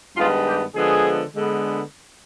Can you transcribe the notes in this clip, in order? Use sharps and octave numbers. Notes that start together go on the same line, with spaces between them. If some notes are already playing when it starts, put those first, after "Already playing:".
G2 D#3 G#3 B3 F4
G4
D3 F3 G#3 B3 G#4
D3 G#3 B3